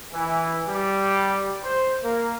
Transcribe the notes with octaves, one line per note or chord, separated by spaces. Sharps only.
E3
G3
C5
A#3